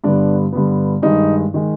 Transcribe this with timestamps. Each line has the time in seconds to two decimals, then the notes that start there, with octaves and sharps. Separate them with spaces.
0.04 G2 D3 G3 B3 D4
0.53 G2 D3 G3 B3
1.02 G2 D#3 G#3 D#4
1.54 D#3 G#3